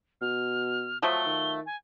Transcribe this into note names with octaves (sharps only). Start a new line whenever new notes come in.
B2 F6
F3 F#3 A3 G7
D#3
G#5